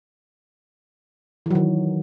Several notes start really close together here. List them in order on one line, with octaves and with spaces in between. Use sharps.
E3 F#3 D#3